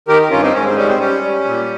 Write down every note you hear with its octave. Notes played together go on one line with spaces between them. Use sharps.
D#3 G4 A#4
G2 C#4 F4
C4 D#4
G#2 C#4
C4
G3 C#4
C4
G3 C#4
G3
A#2